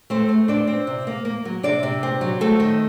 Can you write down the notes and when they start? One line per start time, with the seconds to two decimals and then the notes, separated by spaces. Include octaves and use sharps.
0.10 A3 C4 C5
0.29 A3
0.48 C4 D4 D5
0.67 C4
0.87 C3
1.07 A#3
1.25 A#3
1.45 F#3
1.63 C3 D4 D5
1.83 C3
2.03 C4
2.21 F#3
2.41 A3 C4 A4
2.60 D#3